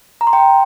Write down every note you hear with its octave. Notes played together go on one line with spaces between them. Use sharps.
A#5
C6
G5